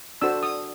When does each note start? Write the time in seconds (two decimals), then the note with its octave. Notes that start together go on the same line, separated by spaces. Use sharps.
0.22 D4 F#4 A4 C5 E6
0.43 D#6